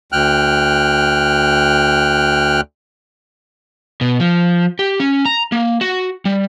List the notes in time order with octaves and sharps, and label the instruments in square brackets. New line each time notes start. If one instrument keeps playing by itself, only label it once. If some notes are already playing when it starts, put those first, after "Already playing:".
[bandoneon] D2 G5 F6 F#6
[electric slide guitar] B2
F3
G4
C#4
A#5
A#3
F#4
G3